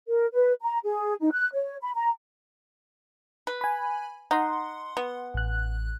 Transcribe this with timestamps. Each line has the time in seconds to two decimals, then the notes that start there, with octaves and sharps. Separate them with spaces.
0.08 A#4
0.33 B4
0.62 A#5
0.84 G#4
1.20 D#4
1.32 F#6
1.53 C#5
1.81 B5
1.95 A#5
3.47 B4
3.61 G#5 B5
4.31 D#4 F#5 C6
4.97 B3
5.34 A1 F#6